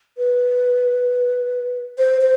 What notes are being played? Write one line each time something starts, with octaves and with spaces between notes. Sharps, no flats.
B4
C5
C5